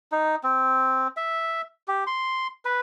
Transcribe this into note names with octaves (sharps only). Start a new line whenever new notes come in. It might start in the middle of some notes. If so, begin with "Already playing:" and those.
D#4
C4
E5
G4
C6
B4